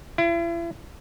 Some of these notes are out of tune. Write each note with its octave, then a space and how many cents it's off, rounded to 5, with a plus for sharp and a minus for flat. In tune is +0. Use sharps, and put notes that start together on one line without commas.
E4 +40